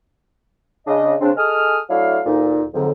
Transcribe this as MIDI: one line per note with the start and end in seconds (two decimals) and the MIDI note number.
0.87 1.15 49
0.87 1.15 62
0.87 1.15 75
1.21 1.31 49
1.21 1.31 60
1.21 1.31 62
1.37 1.78 68
1.37 1.78 69
1.37 1.78 75
1.37 1.78 80
1.37 1.78 87
1.37 1.78 89
1.90 2.19 54
1.90 2.19 57
1.90 2.19 62
1.90 2.19 64
1.90 2.19 77
2.25 2.63 38
2.25 2.63 46
2.25 2.63 63
2.74 2.91 41
2.74 2.91 44
2.74 2.91 50
2.74 2.91 54